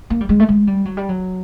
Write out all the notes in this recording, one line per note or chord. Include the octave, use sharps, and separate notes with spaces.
A#3
G3
G#3
A3
G#3
G3
F#3
G3
F#3